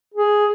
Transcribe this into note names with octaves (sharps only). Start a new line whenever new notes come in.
G#4